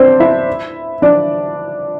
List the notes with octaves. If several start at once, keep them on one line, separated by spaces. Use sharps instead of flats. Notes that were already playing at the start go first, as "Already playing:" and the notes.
Already playing: C4 D4 C5
E4 E5
D4 D5